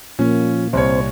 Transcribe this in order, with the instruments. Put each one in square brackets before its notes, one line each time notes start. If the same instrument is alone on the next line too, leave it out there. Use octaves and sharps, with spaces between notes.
[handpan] A#2 A#3 [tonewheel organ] F3 [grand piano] C#4
[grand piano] C2 C#5 [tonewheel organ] C4 C5